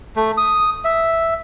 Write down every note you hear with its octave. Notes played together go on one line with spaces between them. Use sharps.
A3
D#6
E5